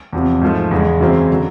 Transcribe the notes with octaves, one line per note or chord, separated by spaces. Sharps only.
E2 C3 F3
G#2 F3 A3
E2 C#3 E3 G#3
F#2 C#3 E3 G#3 C4
D3 F#3